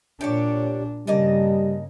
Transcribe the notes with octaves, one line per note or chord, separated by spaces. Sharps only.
A#2 D4 G4 C#5 D5
G2 C#3 G3 A#3 D#5 A5